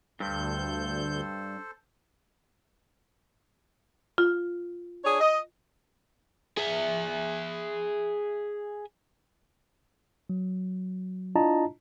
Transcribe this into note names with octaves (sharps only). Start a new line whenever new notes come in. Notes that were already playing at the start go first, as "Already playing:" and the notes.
D2 G2 A4 C5 G6
F4
D4 G#4 C#5
D#5
G#4 E5
F#3
D4 E4 F4 D#5 A5 A#5